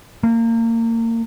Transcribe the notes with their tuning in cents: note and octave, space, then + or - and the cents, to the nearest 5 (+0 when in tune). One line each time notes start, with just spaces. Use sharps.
A#3 -30